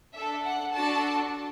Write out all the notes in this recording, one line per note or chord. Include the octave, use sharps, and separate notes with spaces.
D4 A4 E5
F#5
D4 F#4 A4 A5